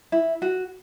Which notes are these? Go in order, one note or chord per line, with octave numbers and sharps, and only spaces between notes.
E4
F#4